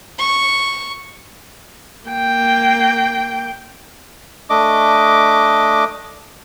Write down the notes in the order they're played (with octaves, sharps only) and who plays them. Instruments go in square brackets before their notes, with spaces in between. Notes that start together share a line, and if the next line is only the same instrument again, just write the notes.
[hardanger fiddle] C#6
[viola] A#3 G5
[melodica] A3 D4 D#5 D6